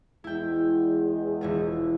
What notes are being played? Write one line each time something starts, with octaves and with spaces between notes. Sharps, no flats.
E2 G#3 E4 G5
E1 E4 F4